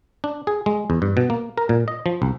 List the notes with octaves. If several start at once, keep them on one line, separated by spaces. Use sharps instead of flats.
D4
G#4
G#3
E2
G2
B2
A#3
A#4
A#2
D#5
F3
C2